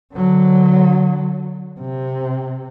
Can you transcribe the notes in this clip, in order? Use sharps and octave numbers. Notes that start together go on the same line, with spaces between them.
D3 F#3
C3